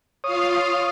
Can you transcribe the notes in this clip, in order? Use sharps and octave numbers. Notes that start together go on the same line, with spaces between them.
F4 C#5 F5 D#6